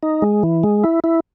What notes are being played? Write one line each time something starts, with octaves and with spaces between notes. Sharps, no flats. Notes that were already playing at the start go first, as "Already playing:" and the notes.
D#4
G#3
E3
G#3
E4
E4